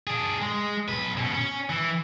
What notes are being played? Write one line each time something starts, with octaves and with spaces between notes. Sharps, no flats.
D4 G#4
G#3
B1 B4
B2 C#4
C#4
E3